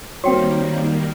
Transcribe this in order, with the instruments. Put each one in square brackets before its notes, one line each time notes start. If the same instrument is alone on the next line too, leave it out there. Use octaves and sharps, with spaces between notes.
[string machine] D#3 G3 A#3 [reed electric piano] C4 C#5 [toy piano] F#4 G5